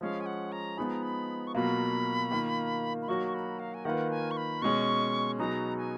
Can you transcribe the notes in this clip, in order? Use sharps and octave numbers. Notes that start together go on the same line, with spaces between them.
F3 G#3 C#4 F5
G#5
F#5
A#5
F3 G#3 B3 D#4 G#4 B5
A#5
B5
C#6
B2 F#3 A#3 F4 B5
D#3 A#3 F4
B5
F#3 A#3 D#4 F#4 C#5 C#6
C#6
B5
F5
G#5
D#3 A#3 F4 B4 F#5
G#5
C#6
B5
B2 G#3 C#4 C#6
B2 F#3 B3 D#4 G#4 A#5
G#5